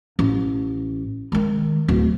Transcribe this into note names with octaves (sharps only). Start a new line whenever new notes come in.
A1
D#3 G#3
D1